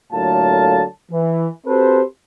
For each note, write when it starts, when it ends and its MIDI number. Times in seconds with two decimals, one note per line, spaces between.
0.13 0.83 45
0.13 0.83 50
0.13 0.83 54
0.13 0.83 58
0.13 0.83 65
0.13 0.83 81
1.11 1.46 52
1.66 2.01 60
1.66 2.01 66
1.66 2.01 67
1.66 2.01 69
1.66 2.01 71
1.66 2.01 72